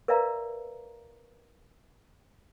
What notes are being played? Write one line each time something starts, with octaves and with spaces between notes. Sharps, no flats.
A#4 B4 D5 E5 F5 A#5